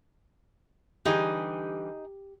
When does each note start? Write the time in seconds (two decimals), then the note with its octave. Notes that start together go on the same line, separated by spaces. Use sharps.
1.05 D3 E3 G3 D#4 G4 G#4